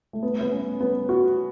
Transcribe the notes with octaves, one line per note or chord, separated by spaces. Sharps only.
A3
B3
B3
C#4
B3
F#4